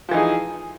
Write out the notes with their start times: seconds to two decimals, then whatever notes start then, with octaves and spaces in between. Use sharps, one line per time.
0.09 F3
0.11 E3
0.14 D#4
0.17 G#4